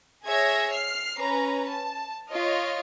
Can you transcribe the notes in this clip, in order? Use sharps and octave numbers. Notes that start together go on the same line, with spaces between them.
G#4 C#5 E5 G#6 A#6
F6 C7
C#4 B4 A#5
A5
F4 C#5 D#5 F6